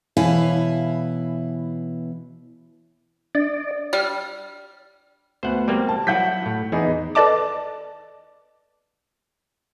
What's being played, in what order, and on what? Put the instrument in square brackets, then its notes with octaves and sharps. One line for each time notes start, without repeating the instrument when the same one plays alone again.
[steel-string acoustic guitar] B2 E3 E4 C#5 F5 G#5
[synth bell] D4 [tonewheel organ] D5
[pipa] G3 [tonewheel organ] F6
[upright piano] D2 B3 [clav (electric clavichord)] C5 F#5
[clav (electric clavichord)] G3 A#3 C4
[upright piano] A5
[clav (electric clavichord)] F#3 E4 [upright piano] F#5 G6 B6
[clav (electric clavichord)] A2
[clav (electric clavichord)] E2 [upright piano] B3 D#4 G#4
[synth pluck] A4 B4 D5 D#5 A5 D6